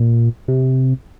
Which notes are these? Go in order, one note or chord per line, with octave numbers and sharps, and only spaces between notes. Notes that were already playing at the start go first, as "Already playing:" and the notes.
Already playing: A#2
C3